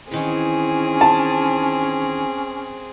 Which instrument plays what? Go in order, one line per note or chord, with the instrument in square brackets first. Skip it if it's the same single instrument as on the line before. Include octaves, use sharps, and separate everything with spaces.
[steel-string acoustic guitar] D#3 E3 [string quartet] C4 G#4 [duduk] C#4
[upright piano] A5